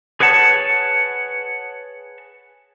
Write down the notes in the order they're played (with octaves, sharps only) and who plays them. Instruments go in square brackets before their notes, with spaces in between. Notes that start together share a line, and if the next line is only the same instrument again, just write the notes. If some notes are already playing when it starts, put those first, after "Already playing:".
[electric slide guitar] G#4 B4 C#5 F#5 A5